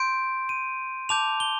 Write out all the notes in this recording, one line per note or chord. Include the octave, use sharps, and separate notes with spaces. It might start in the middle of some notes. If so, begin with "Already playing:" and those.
Already playing: C6 G6 D7
D#7
A5 D6 G6 F7
G7